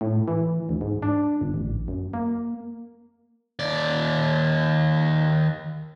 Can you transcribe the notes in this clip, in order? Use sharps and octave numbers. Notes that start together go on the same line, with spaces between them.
A2
E3
D2
G#2
D4
G1
A1
F#2
A#3
D#2 D5